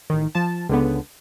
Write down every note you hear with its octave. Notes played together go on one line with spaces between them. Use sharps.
A1 D#3
F3 A5
C#2 D3 B3